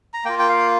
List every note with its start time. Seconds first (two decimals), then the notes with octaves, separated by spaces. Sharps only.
0.13 A#5
0.25 A#3 F4 G5
0.39 G5
0.49 F5